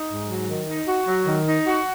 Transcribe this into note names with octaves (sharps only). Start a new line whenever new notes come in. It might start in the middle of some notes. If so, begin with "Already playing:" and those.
Already playing: D#4
G#2
F#3
D#3
D#4
F#4
F#3
D#3
D#4
F#4